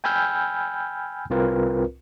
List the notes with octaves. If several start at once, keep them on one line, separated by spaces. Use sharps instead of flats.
G5 G#5 B5 E6 F6 G6
C2 C4 F4 A#4 B4